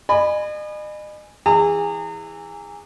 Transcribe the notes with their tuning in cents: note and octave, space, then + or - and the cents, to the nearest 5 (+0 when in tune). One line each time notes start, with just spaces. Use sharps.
D#5 -40 G#5 +0 B5 +0
E3 +0 G#4 -25 A#5 -35